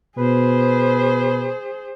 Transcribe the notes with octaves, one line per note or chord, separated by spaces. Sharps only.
B2 G#4 B4 C5